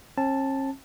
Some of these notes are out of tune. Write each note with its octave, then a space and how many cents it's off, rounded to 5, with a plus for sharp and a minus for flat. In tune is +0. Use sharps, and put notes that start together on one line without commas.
C#4 -45 A5 +0